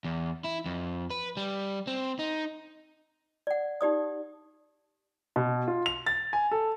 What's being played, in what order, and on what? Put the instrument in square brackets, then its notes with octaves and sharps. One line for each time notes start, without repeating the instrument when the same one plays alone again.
[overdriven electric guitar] E2
E4
F2
B4
G3
C4
D#4
[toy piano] D5 F#5
D#4 G4 D5 D#6
[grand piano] B2
F4
F7
A6
G#5
A4